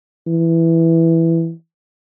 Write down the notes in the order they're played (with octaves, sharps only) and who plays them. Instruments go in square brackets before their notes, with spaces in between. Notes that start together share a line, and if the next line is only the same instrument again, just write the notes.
[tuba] E3